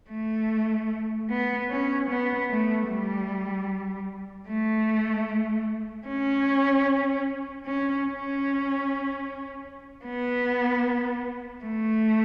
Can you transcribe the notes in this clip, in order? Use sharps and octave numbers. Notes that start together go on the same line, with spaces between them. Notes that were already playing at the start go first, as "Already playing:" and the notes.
A3
B3
C#4
B3
A3
G3
A3
C#4
C#4
C#4
B3
A3